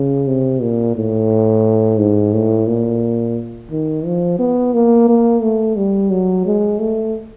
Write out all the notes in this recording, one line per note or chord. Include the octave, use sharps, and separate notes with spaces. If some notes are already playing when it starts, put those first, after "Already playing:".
Already playing: C#3
C3
A#2
A2
G#2
A2
A#2
D#3
F3
B3
A#3
A#3
A3
G3
F#3
G#3
A3